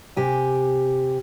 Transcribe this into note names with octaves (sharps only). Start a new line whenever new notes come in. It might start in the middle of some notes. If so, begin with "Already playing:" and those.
C3 G4 G#5